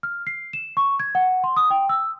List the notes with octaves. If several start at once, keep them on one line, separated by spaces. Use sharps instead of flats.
F6
C7
E7
C#6
G#6
F#5
C6
D#6
G5
E6